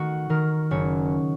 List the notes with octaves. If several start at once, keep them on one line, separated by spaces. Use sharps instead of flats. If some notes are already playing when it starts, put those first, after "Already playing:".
Already playing: D#3 A3 F#4
D#3 A#4
F#1 C#5